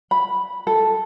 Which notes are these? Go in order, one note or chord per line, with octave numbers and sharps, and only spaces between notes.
B5
A4